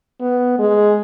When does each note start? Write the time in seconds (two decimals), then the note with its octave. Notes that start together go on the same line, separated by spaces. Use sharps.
0.21 B3
0.59 G#3